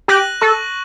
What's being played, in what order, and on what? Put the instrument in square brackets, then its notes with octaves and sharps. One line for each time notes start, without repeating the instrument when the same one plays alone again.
[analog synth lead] G4 [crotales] F#6 A#6 D#7 F#7
[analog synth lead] A4 [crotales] C#6